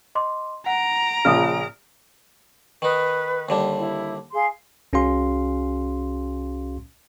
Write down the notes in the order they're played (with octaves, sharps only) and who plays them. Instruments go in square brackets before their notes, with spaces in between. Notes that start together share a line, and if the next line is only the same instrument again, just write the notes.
[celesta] D#5 C6 D6
[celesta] F#5 [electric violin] A#5 D7
[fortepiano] A#1 A#2 C#3 [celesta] D#6 F6
[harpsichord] D#3 D#4 [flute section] B4
[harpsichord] D#2 D3 G3
[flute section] E4
G#4 F5 C6
[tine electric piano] C2 C#4 F#4 G#4 F5 C6